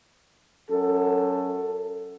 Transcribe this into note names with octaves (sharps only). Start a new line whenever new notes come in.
F#2 A4